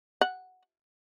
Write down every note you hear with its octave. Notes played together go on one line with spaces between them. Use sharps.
F#5